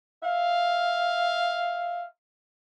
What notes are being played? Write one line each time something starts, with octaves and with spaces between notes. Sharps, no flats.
E5 F5